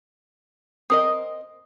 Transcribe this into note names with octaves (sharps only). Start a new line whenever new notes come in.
C4 A#4 D#5 D#6